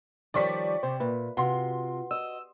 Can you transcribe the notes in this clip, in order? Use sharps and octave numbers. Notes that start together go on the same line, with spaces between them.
D#3 F3 G3 C#5 D5 G5 C#6 B6
C3 C5 G5
A#2 B4 E5
C3 F4 F#4 B4 F#5 C6
D#5 E6